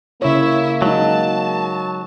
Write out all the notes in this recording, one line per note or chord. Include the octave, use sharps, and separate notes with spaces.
C#3 A#3 E4 C#5 E5
F#3 G#3 D#4 A5